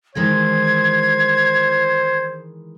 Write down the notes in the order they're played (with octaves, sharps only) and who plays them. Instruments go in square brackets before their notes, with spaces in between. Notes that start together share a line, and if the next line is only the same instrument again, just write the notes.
[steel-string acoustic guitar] D#3 E3 G#3 [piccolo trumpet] C5 [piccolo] G#6